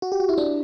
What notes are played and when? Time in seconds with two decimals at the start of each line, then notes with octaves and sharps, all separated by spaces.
0.02 F#4
0.12 G4
0.20 F#4
0.29 E4
0.38 D4